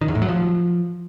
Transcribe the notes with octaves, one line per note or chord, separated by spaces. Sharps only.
D#3
E2
A2
F#3
F3